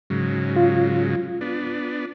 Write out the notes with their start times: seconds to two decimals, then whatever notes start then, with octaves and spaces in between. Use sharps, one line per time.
0.10 G#2 C#3 F#3
0.56 F4
1.41 B3 D4